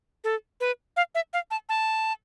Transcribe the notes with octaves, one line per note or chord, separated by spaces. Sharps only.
A4
B4
F5
E5
F5
A5
A5